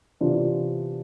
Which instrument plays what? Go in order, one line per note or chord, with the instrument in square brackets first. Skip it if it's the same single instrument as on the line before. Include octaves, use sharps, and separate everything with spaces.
[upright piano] C3 E3 B3 D4 F4